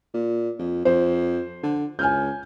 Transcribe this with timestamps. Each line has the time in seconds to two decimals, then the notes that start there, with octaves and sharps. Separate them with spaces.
0.14 A#2
0.59 F2
0.85 F2 C5
1.63 D3
1.99 C#2 G#5 F6 G6